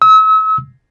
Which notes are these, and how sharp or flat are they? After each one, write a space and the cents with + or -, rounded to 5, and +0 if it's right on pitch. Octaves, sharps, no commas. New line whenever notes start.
E6 -40